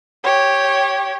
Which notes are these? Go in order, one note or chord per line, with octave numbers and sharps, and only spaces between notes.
G4 C#5